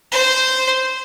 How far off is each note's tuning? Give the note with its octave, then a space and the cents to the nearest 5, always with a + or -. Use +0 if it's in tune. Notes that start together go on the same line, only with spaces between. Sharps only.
C5 -10